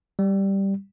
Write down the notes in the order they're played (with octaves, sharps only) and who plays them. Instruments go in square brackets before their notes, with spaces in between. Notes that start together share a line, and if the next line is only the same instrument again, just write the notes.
[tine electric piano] G3